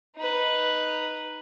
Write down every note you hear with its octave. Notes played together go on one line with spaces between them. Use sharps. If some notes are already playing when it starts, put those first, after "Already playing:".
D#4 B4